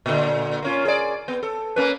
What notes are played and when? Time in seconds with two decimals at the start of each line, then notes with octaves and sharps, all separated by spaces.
0.06 A#2 D3
0.63 A#3 C#4 F4
0.85 G#4 D5
1.28 B3
1.43 A4
1.76 A#3 C#4 B4